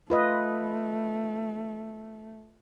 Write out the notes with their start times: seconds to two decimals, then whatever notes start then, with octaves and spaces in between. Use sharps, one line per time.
0.10 A3 F4 B4 D#5